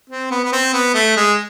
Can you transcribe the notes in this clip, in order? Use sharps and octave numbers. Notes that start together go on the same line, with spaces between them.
C4
B3
B3
C4
B3
A3
G#3